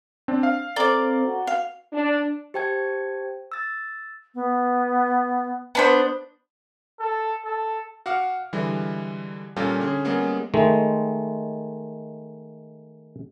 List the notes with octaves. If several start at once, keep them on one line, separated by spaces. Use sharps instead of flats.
C4 D4
F5
C4 A4 D5 A#5 D6 G7
F#4
F5
D4
G4 C5 G5 A5 G#6
E6 A6
B3
B3 D4 C5
A4
A4
F#4 F5 F#5 D6 F6
D3 E3 G3 G#3
A#2 G3 C#4 F4 G4 A4
D3 C#4 G#4
G3 G#3 A#3 B3 C#4 G#4
D#3 G#3 A3